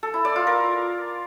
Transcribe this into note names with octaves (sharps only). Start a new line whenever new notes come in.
A4
E4
D5
F4
A#4